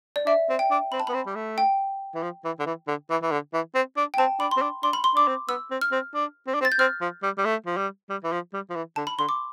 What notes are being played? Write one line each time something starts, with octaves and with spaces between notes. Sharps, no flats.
D5
D4 E5
C4
G5
D4
C4 B5
A5
B3 B5
C4
G3
A3
G5
E3
F3
E3
D3
E3
D3
E3
E3
D3
E3
C4
D4
G5
C4 A5
D4 B5
C6
C4
D4
D4 C6
B5
C6
D4 D6
C4
B3 E6
C4
F6
C4
D4
C4
D4
C4
A6
G6
C4 F6
F3
G3
G3
A3
F3
G3
G3
E3
F3
G3
F3
E3
D3 A5
B5
D3 C6
D6